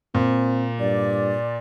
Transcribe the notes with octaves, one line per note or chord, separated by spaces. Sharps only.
A#2 C4
G2 D5